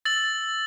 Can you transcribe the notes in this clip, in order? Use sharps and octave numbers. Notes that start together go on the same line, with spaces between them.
E6 A6 F#7